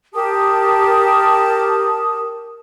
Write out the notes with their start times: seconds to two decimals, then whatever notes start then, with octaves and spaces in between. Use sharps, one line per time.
0.14 G4 A#4 A5 D#6